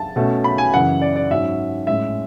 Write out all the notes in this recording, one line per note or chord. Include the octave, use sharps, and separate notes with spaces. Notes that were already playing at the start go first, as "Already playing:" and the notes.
Already playing: A5
B2 A3 C#4
B5
G#5
F#2 C#3 E3 F#5
D5
D5
G#2 F#3 C#4 E5
A2 G#3 C#4 E5